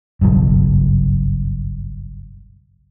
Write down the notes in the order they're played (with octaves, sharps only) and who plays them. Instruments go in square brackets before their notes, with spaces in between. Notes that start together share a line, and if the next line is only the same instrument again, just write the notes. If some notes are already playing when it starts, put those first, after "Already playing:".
[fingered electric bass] F#1 B1 G2